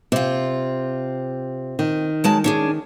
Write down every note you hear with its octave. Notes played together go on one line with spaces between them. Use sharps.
C3 C4 F4
D#3
F#3 G#3 A5
C#4 D4 G#4